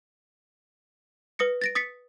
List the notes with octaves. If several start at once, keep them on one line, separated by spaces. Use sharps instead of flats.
B4 D#6 A#6 C#7
A6 A#6 D7
D#6 A6 B6 C#7